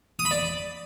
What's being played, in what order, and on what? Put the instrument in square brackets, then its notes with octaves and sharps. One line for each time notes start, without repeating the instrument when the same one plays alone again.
[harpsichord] D#6
B5
D5